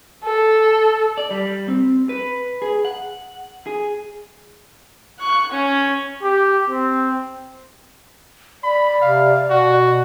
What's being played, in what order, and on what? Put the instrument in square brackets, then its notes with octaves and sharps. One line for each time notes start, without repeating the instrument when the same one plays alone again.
[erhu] A4
[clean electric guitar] D5
G3
C4
B4
G#4
F#5
G#4
[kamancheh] C#6 F#6
C#4
[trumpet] G4
C4
[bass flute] D5 [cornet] B5
[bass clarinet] C3 [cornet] F5
[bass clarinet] B2 [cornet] F#4